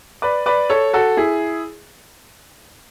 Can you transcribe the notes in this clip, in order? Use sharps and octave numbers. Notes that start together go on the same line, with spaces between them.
B4 D5
B4 D5
A4 C#5
F#4 A4
E4 G#4